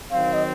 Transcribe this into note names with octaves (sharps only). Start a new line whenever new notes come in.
D#3 F#3 C4 F5
D#5